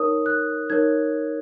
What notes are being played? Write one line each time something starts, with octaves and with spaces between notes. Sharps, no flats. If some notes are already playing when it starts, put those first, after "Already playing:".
Already playing: D#4 A#4 C#5 D#6
F#6
D#4 A#4 C#5 G#6